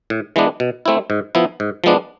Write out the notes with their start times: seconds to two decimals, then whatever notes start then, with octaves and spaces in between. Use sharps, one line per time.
0.10 A2
0.36 E3 G#3 B3 D4
0.60 B2
0.86 A3 C4 E4
1.10 G#2
1.35 F3 B3 E4
1.60 G#2
1.84 F3 G#3 B3 D4